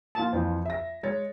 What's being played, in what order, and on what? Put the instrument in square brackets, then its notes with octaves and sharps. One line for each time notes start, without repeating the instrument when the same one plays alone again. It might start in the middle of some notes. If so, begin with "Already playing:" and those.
[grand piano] A#2 [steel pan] F4 A5
[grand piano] F2 E3 [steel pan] C5
[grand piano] E5 A#6
G#3 C#5 A6